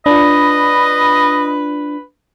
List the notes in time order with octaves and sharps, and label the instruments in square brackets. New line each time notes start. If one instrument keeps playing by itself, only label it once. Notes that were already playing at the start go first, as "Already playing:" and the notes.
[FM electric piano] D4 F4 [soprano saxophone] B4 [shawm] D#5 [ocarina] B5